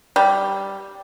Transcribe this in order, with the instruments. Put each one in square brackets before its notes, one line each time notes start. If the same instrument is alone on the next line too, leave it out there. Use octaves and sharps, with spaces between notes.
[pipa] G3